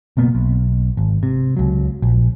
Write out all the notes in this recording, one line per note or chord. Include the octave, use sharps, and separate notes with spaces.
F#1 B2 A#3 B3
B1
G#1
C3
C#2 F#3
A#1